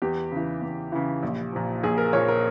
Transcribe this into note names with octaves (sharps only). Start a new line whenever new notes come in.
E2 G4
C#3 E3
E2
C#3 E3
A#1
A#2 F3
A#1 G#4
A#4
A#2 F3 C#5
A#4